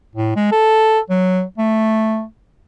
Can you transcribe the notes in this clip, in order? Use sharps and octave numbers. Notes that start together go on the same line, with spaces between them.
A2
G#3
A4
F#3
A3